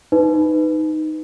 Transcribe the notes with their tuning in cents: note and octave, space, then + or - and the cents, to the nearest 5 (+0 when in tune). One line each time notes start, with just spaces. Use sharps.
D#4 +0 B4 +15